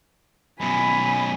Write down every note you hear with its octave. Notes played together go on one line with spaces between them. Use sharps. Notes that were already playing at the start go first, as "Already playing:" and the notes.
F#2 B2 G#5 B5